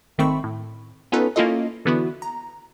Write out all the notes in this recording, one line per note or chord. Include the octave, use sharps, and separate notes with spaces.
G#1 D#3 A3 C4 B5 C#6
A2
B3 C#4 D#4 F4 A4 B4
A#3 C#4 E4 F4 A4 D#5
D3 E3 B3 E4 F#4
A#5